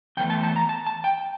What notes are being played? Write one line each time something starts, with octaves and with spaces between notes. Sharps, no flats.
E2 E3 A3 G5
A5
A5
A#5
A5
A5
G5